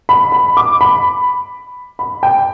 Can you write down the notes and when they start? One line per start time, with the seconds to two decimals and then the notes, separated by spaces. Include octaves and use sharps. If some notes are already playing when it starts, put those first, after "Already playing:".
0.09 B5
0.32 B5
0.57 D6
0.81 B5
1.99 B5
2.23 G5